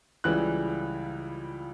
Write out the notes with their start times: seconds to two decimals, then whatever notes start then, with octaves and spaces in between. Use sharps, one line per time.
0.24 C#2 C#3 E3 G3 F#6